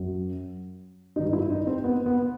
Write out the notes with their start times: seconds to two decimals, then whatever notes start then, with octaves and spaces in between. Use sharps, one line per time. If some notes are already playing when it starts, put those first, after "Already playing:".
Already playing: F#2 F#3
1.16 G2 D#3 G3 D#4
1.33 E4
1.50 D#4
1.67 C4
1.84 B3
2.06 B3